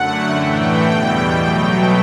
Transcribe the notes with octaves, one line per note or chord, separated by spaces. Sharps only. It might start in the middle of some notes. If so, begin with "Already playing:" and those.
Already playing: F#2 D3 A3 F#5
A2 E3 A3 G5
E2 B2 G3
B2 F#3 A3